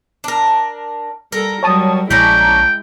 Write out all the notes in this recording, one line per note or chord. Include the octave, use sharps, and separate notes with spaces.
D4 A#4
G3 A4 A#4
F#3 G3 C#5 A5 D#6
A#1 G#3 C#4 D4 E4 D5 G5 A#5